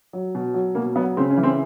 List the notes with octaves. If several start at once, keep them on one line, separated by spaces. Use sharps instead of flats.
F#3
B2
F#3
B2 A#3
F#3 B3
C#3 C4
C#4
E3
C4